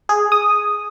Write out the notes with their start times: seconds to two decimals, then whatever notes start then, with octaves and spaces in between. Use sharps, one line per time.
0.09 G#4
0.32 D#6